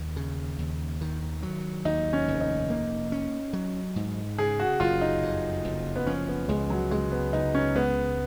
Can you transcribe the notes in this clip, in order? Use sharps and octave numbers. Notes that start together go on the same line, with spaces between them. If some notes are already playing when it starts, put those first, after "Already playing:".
Already playing: D#2
C#3
D#2
D#3
F#3
D#2 D#4
C#4
F1
D#4
A#3
C#4
F#3
G#2
C#3 G#4
F#4
F#1 F4
D#4
F2
F#1
B3
F3 C#4
B3
C#2 G#3
F#3
C#3 G#3
B3
C#2 D#4
C#4
G#3 B3